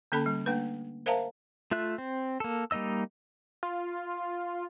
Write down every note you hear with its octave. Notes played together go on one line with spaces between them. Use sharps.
D3 A#3 C#4 A4 A5 B5
G3
A3 A#3 D4 B4
A#4 C5 E5 F5 A5 A#5
A3 F4 E5 F#6
C4
A#3 A4
G3 A#3 D#4 D#5 E6
F4